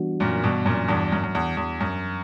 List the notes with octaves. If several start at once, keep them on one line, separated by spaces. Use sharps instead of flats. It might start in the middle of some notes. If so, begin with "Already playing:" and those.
Already playing: E3 G3 B3 D4 F#4
F#2 A#2
G2 B2
F#2 A#2
E2 G2
F#2
F#2
E2
E2
F#2